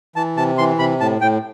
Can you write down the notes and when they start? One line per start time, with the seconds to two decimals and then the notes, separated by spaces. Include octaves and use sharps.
0.16 E3 A5
0.37 C3 A5
0.58 E3 C6
0.79 C3 B5
1.00 A2 A5
1.21 A2 G5